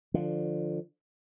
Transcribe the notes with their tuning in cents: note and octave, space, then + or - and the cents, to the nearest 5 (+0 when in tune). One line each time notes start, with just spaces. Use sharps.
D3 +20 F3 +5